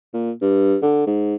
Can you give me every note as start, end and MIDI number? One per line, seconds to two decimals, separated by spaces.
0.14 0.31 46
0.42 0.77 43
0.82 1.03 50
1.07 1.36 44